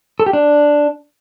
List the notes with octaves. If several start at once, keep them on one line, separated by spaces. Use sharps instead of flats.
A4
G4
D4